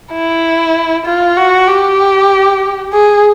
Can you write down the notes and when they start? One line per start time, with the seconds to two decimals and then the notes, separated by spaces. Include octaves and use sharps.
0.13 E4
1.06 F4
1.37 F#4
1.68 G4
2.93 G#4